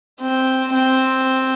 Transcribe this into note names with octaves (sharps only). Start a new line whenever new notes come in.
C4
C4